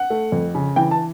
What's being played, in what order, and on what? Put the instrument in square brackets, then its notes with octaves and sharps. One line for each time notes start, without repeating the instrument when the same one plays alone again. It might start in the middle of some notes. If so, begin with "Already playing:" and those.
Already playing: [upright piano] F#5
A3
F2
C#3
E3 G5
A5